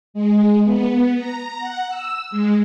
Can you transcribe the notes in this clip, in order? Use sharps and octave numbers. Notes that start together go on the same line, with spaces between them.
G#3
B3
A#5
F#5
E6
G#3